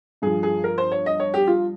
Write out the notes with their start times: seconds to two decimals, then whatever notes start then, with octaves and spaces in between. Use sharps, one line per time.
0.22 G2 F3 G#4
0.43 G#4
0.64 A#4
0.78 C5
0.92 C#5
1.06 D#5
1.20 C#5
1.34 G4
1.47 F4